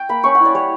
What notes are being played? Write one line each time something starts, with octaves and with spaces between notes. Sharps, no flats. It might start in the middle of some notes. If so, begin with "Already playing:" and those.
Already playing: G5
A#3 B5
C#4 C#6
F#5
E4
D5
G3 C#5